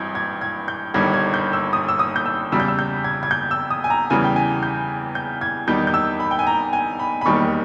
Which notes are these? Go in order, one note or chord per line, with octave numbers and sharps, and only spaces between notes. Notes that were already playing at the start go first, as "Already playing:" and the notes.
Already playing: G#1 G2 E3 G6 G#6
G#6
G#6
G6
G1 G2 D#3 G3 G#6
G#6
G6
E6
D#6
E6
D#6
G6
E6
E2 C#3 G3 E6
G6
E6
G6
G#6
G#6
G6
E6
D#6
G#5
A#5
E2 C#3 E3 G3 G#5
G5
G#5
G6
G6
G#6
E2 D#3 G3 G6
G6
E6
B5
G5
G#5
A#5
G#5
B5
B5
E1 D#2 D#3 G3 C#6